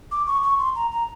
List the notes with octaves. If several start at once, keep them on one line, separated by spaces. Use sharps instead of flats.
D6
C#6
C#6
C6
A#5
A#5